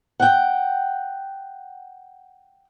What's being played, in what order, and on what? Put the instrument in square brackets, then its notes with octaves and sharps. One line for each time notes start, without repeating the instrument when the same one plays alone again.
[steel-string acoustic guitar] F#5 G5